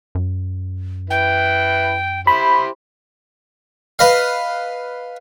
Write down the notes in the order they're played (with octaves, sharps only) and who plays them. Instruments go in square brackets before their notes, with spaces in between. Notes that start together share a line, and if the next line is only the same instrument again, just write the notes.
[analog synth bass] F#2
[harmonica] E4 B4 [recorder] G5
[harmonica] E4 G4 C5 [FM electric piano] B5
[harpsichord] B4 D#5 F5